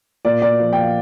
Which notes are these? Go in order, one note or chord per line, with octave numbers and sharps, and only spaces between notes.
A#2 D5
D5
F3
G5
F5